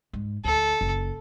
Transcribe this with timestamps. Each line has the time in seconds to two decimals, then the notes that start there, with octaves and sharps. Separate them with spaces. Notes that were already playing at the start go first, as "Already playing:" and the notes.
0.13 G#2
0.45 D2 A4
0.81 F#1